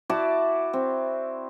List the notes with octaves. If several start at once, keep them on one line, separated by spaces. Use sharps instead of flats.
E4 F#4 D5 A5
C4